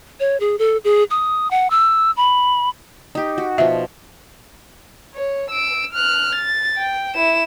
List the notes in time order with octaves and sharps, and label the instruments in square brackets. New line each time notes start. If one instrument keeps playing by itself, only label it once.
[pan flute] C#5
G#4
A4
G#4
D#6
F#5
E6
B5
[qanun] D#4 G4
F#4
[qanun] B2 F3 [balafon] E5
[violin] C#5
E6 D7
F6 F#6
A6
G5
E4 E7